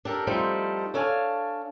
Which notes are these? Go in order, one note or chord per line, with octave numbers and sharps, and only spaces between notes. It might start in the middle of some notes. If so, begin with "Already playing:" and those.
D4 G4 A4 A#4
F3 G3 A3 C4 D#4
D4 A4 C#5 F5 G#5